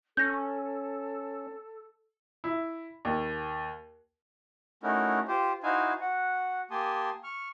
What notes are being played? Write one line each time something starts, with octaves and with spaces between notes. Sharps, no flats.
C#4 A4 G6 A#6
E4
D#2
A3 C#4 D#4 E4 F#4 A#4
F4 G4 C5
D#4 E4 F#4 C5 F5 G#5
F#4 F#5
A#3 G4 G#5 A5 C6 D#6
C#6 F6